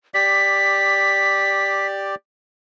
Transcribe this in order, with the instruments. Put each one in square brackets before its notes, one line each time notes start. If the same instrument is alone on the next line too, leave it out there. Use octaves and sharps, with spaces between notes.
[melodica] G4 D5 [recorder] B6